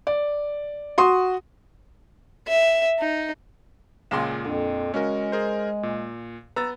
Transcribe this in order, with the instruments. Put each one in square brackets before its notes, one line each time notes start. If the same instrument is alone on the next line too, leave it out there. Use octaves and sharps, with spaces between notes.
[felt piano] D5
F#4 C6 D#6
[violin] E5
D#4
[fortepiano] C#2 G#3 C6 [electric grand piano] A#2 E7
[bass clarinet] F2 [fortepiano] D3
[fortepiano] C#3 [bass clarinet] G#3 [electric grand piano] C#4 F#4 A#4
[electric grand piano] G#4 A#4 C5
A#2
[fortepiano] B3 [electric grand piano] A#5 E6 A6